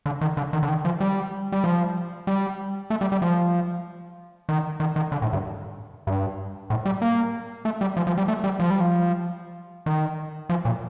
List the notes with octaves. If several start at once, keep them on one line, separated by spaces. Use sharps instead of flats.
D3
D#3
D3
D#3
D3
D#3
F3
G3
G3
F3
G3
A3
G3
G3
F3
D#3
D#3
D#3
D3
A2
G2
G2
A2
G3
A#3
A3
G3
F3
F3
G3
A3
G3
F3
G3
F3
D#3
F3
A#2